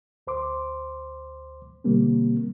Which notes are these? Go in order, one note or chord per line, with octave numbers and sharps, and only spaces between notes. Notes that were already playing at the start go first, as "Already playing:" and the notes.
D2 C5 C6 D6
B2 D3 G3 A#3 C4